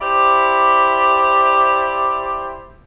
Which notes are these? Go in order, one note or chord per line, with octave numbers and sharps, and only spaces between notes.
E4 G4 C5 D5